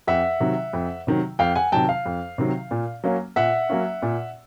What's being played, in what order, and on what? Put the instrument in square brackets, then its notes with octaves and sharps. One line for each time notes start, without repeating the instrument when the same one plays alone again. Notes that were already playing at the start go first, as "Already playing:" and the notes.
[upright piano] F2 E5 F#5
C3 D#3 F#3
F2
C3 D#3 F#3
F2 F5 G5
F#5 G#5
C3 D#3 F#3 G5 A5
F5
F2
C3 D#3 F#3
A#2
F#3 A#3 C#4
A#2 E5 F#5
F#3 A#3 C#4
A#2